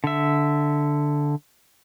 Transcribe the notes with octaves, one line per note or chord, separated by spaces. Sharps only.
D3 E5